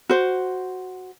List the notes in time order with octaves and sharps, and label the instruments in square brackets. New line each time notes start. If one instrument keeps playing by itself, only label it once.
[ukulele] F#4 C5